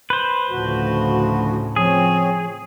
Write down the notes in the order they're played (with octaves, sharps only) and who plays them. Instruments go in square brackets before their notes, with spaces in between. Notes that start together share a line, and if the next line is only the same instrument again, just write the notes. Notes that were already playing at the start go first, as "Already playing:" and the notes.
[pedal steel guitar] B4 C5
[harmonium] D2 F3 F#4 [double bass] A2 C#3
[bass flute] F3 [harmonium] C4 C#5 [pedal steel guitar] G#4